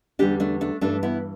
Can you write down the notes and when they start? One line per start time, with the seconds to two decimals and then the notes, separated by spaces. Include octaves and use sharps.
0.19 E2 D3 G3 D4 G4
0.40 A3 D4
0.61 A3 D4
0.81 G2 E3 G3 A3 D4
1.03 B3 E4